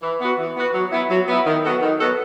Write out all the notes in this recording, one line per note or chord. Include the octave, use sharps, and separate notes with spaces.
E3
B3 F#4
E3
B3 F#4
F#3
B3 E4
F#3
B3 E4
D#3
F#3 B3 F#4 A4
D#3
F#3 B3 F#4 A4